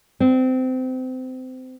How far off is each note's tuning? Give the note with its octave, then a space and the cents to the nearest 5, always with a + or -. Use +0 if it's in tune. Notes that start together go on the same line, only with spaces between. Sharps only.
C4 -25